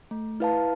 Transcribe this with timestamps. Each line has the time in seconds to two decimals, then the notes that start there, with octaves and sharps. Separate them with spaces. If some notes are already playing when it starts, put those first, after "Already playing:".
0.11 A3
0.40 E4 B4 F5 A5